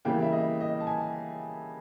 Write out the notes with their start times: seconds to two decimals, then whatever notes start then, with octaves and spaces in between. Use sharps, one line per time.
0.05 C#3 E3 G3 A#3 G5
0.22 E5
0.32 D#5
0.60 D#5
0.80 A5
0.87 G#5